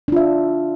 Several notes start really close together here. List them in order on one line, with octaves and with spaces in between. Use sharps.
D4 F4 E5